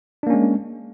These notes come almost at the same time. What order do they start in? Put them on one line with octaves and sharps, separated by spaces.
D4 A#3 C#4 G#3